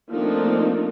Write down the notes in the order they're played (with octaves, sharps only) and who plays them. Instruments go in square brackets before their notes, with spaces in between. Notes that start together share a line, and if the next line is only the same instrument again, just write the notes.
[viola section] F3 A3 A#3 C4 D4 D#4